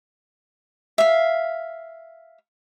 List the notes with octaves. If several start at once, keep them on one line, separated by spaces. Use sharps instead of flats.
E5 F5